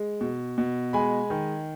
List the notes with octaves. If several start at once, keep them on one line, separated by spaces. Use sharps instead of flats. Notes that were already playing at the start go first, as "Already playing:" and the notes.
Already playing: G#3
B2
B2
G#3 G#5 B5
D#3